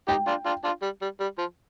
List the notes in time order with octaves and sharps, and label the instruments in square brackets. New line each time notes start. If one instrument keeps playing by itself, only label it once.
[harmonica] D#4 G4 [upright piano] G5
[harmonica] D4 F4
D4 F4
D4 F4
G3
G3
G3
F3